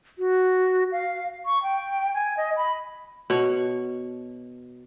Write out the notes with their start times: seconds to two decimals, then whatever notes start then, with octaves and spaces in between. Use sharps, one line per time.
0.19 F#4
0.92 F5
1.46 C#6
1.63 G5
2.14 G#5
2.37 D#5
2.57 B5
3.30 B2 C#5